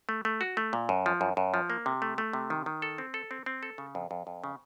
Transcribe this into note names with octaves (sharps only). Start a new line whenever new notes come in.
A3
A3
F#4
A3
A#2
F#2
F3
F#2
F#2
F3
A#3
C3
A3
A3
C3
D#3
D#3
A4
C4
A4
C4
C4
A4
C#3
F2
F2
F2
C#3